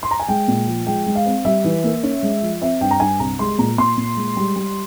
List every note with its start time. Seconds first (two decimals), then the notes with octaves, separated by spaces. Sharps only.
0.03 C6
0.11 A#5
0.20 G#5
0.28 G#3 G5
0.48 A#2
0.67 F3
0.87 G#3 G5
1.06 G#3
1.15 F5
1.26 C4
1.45 G3 E5
1.64 E3
1.84 A#3
2.03 C#4
2.23 G#3
2.42 F3
2.61 C4 E5
2.81 G2 G5
2.91 A#5
3.00 G2 G#5
3.20 C2 A#5
3.39 G#3 C6
3.58 A#2 A#5
3.78 A#2 C6
3.97 A#2
4.17 G#3
4.37 G3
4.56 G3